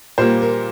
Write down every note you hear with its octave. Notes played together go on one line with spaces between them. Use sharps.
A#2 G3 A#3 C5
A#4